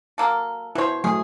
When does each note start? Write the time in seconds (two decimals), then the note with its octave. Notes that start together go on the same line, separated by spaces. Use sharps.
0.18 F#3 A#3 A4
0.75 B2 E4 C5 C#5
1.04 F#3 A3 G#4